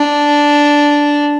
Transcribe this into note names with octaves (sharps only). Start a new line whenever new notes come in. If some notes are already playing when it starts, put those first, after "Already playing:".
Already playing: D4